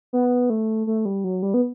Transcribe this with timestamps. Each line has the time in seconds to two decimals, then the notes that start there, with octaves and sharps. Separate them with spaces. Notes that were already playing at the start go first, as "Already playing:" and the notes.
0.13 B3
0.50 A3
0.87 A3
1.05 G3
1.24 F#3
1.43 G3
1.54 B3